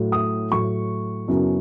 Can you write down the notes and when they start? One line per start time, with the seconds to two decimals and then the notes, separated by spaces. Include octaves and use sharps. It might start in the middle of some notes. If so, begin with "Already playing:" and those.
Already playing: A2 F#3 A3
0.12 D#6
0.51 A2 F#3 A3 C#6
1.28 F#2 C#3 F#3 B3 E4